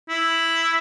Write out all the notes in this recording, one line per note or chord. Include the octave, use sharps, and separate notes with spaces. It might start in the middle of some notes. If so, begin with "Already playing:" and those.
E4